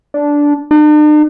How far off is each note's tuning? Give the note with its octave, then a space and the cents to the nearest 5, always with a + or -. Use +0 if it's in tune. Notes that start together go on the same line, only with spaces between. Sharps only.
D4 -10
D4 +45